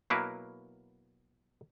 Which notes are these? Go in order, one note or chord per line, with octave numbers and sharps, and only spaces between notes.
B2 F#3 A#3 E4 A#4 B4